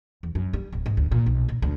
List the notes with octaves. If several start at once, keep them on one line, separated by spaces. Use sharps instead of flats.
E2
F#2
G3
D1
G#2
D2
A#2
B1
A#2
D2